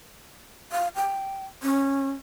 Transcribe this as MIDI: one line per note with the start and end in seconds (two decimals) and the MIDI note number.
0.72 0.88 77
0.96 1.46 79
1.63 2.11 61